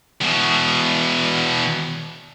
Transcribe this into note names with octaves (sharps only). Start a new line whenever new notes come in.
E2 B2